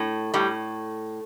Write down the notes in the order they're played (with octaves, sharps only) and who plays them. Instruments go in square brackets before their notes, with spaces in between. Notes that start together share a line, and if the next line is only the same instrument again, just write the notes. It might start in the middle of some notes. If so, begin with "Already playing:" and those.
Already playing: [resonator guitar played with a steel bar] A2
A2 G3